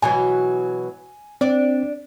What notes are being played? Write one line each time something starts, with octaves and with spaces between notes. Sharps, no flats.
B2 E3 F#3 G#5
C4 D4 D5